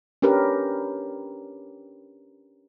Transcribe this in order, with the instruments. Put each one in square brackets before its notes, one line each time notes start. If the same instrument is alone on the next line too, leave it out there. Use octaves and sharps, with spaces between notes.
[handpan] C#4 D4 G4 A#4 B4